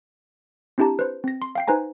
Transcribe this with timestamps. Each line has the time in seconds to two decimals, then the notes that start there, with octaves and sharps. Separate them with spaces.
0.78 C4 D4 E4 G4 A5 A#5
0.99 B4 C5
1.24 C4 A#6
1.42 C6
1.55 F5 G5 C7
1.68 D#4 B4 C5 G#5 A#5